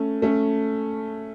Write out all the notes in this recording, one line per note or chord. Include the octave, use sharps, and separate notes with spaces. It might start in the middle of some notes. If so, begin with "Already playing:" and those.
Already playing: A3 C#4
A3 C#4